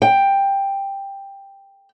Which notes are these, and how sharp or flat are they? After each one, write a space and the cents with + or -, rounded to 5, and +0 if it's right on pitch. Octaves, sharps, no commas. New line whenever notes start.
G5 +10